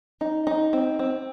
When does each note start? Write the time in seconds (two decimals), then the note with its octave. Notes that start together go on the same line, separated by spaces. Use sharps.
0.21 D#4
0.47 D#4
0.73 C4
0.99 C4